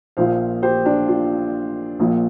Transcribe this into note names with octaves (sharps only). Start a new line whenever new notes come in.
A#1 A#2 F3 C5 F5
G4 C5
D4 G4
F4
A#1 A#2 F3